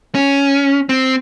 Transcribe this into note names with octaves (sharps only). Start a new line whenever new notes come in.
C#4
C4